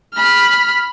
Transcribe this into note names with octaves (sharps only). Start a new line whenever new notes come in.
B5 F6